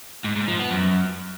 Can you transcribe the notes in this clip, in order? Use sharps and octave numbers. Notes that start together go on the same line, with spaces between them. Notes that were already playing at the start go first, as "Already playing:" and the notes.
G#2
G#2
F3
B3
F#2